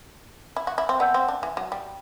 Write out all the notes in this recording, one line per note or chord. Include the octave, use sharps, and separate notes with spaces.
E4
F#4
E4
C4
B3 D5 F#5 A5 E6 G6
C4
D4
E3
F#3
G3